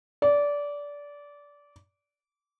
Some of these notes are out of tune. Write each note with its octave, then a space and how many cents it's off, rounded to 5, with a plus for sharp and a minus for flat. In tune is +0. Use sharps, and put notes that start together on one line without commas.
D5 -20